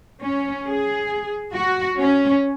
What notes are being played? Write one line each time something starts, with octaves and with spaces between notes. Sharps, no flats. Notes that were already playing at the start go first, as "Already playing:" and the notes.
C#4
G#4
F#4
C#4